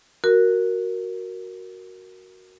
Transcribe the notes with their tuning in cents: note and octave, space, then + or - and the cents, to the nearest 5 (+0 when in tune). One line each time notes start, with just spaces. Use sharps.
F#4 +0 A#4 +0